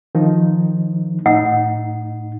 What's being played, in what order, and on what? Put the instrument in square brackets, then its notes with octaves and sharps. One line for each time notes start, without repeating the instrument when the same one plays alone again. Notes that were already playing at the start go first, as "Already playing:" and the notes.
[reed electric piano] D#3 F3 D#4
[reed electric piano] A2 D#4 [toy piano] F#5